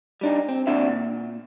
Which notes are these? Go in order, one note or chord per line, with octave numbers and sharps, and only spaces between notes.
G3 D4 D#4
C4
D#2 C4 D4 F#4 E5
A#2